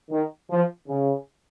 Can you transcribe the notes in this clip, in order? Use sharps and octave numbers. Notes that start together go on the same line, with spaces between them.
D#3
F3
C#3